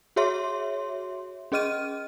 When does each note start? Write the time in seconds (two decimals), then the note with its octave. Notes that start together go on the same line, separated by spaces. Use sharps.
0.16 F#4 G#4 C#5 E5 C6
1.52 C#4 G#4 D#5 F6 D#7